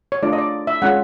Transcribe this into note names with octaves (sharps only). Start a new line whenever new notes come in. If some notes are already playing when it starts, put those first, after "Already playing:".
C#5
A3 D4 F4 D5
D#5
D5
E5
G#3 C#4 F4 F#5